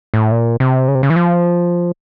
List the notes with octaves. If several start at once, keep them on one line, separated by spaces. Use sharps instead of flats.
A2
A#2
C3
C#3
C3
C#3
E3
F3